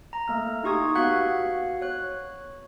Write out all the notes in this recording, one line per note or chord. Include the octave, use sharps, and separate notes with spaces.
A#5
A3 A#3 F6
D#4 F4 G4 C#6 D#6 G#6
B3 F#4 F5 F#5 F#6 G#6
C#5 F#6